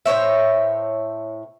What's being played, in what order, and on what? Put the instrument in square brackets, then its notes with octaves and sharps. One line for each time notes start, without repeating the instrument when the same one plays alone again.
[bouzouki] A2 C5 C#5 E5